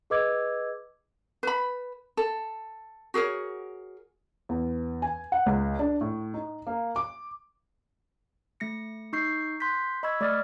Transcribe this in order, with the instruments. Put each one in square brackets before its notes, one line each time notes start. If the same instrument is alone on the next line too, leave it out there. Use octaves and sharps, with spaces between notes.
[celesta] G#4 B4 D#5 D6 E6 G#6
[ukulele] B4 B5
A4
F#4 G#4 A#4 C#5
[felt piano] E2
G#5
F#5
C#2
D4
A2
D#4
A#3
D6
[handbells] A3 A#6 C#7
D#4 C#6 G6 C7
C6 F#6 G6 B6
D#5 B5 C#6 E6 G#6
A3 D5 D6 D#6 F6 A6